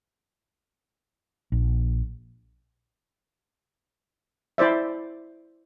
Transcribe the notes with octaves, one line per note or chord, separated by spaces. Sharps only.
A#1
E4 C5 D5 E5